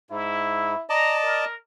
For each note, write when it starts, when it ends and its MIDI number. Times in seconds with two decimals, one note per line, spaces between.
0.10 0.75 44
0.10 0.83 64
0.89 1.45 74
0.89 1.45 75
0.89 1.45 81
0.89 1.22 82
1.23 1.55 70